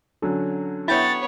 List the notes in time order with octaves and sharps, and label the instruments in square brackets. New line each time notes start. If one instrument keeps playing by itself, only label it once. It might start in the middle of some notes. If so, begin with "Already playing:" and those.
[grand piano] D3 F#3 C#4
[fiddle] B3 C#5 [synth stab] E4 G5 [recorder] A6